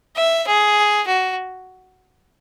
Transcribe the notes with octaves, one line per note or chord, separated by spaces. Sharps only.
E5
G#4
F#4